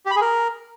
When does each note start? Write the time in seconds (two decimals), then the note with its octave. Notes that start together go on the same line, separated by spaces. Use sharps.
0.06 G4
0.11 B5
0.16 G#4
0.21 A#4